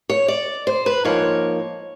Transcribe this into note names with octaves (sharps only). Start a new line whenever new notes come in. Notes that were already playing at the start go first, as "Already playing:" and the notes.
C#5
D5
C5
B4
G#2 F3 A#3 C#5